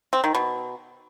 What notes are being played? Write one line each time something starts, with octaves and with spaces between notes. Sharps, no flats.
C4
D#3
B2